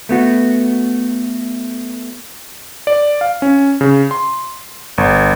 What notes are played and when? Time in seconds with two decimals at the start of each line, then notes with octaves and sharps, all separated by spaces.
0.09 A3 B3 F#4
2.87 D5
3.21 F5
3.42 C#4
3.81 C#3
4.11 C6
4.98 G1